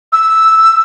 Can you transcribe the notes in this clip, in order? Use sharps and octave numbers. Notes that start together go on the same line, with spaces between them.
E6